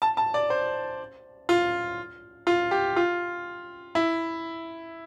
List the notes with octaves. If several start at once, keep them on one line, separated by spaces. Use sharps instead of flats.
A5
A5
D5
C5
F4
F4
G4
F4
E4